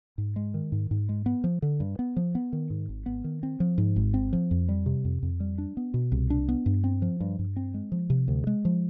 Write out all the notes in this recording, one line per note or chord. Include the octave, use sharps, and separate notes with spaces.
G#2
G#3
D#3
G#2
G#2
G#3
B3
F3
D3
G2
B3
F3
B3
D#3
G#2
G#1
B3
D#3
C4
F3
G#2
G#1
C4
F3
F2
G3
C3
F2
F2
G3
D4
B3
B2
C2
D4
B3
G2
C4
F3
G2
G2
C4
G#3
F3
C3
D2
G#3
F3